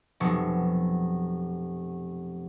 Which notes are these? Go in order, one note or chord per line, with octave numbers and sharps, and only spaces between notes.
F1 B2 F#3 C#6